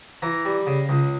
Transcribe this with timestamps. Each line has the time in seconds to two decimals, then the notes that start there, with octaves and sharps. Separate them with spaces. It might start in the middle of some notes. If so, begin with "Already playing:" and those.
0.22 E3 A#5
0.45 G3
0.67 C#3
0.89 C#2